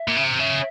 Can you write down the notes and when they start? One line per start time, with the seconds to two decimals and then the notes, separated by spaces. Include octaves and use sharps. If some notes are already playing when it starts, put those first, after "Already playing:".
Already playing: E5
0.08 A#2
0.17 C#3
0.24 C3
0.39 C#3 E5